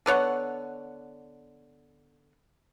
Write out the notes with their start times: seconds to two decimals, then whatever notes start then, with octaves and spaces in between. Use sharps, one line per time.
0.06 D3 B3 C#5 F#5